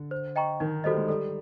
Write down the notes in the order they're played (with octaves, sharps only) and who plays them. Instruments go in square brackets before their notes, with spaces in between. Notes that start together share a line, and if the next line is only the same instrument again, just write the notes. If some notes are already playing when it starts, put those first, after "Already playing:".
Already playing: [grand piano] D3
[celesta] C5
D#5 G5 A#5 C#6
[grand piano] D#3 [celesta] D#4
[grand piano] G3 [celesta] F#4 A4 C5 D#5
[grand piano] G#3
[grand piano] G3 [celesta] A4